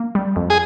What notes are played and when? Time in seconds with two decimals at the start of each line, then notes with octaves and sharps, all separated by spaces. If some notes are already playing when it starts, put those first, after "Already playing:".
Already playing: A#3
0.15 G3
0.36 F2
0.50 G#4